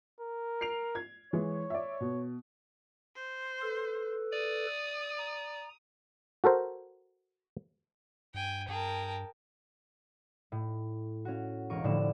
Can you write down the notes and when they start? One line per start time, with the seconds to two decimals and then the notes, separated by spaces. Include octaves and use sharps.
0.20 A#4
0.61 C7 D7 F7
0.95 G#6
1.33 E3 G#3 C#5
1.70 D5 E5
2.01 B2
3.15 C5
3.62 A4 B4
4.33 D5 D#6
5.17 A#5
6.44 F#4 A4 A#4 C5
8.34 G2 G5 G#5
8.68 G2 G#4 A#4 G5 A5
10.52 A2
11.25 C#4 F#4
11.70 E1 A#4 C#6 D7 D#7
11.84 F1 A2 D3 D5 E7